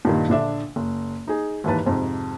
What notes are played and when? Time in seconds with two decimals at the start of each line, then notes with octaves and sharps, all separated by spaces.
0.05 G2 A#2 D#3
0.28 A#1 D3 D4 E5
0.76 F#1
1.28 D#4 G#4
1.64 D#2 G#2 E3 B4 A5
1.86 F2 G#2 C3